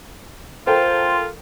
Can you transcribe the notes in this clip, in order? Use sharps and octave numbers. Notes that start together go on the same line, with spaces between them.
F4 A4 A#4 C5 G5